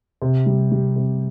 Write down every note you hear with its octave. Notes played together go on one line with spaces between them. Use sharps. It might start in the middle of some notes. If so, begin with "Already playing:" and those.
C3
G3
G3
C3